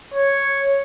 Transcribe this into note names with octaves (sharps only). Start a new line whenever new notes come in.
C#5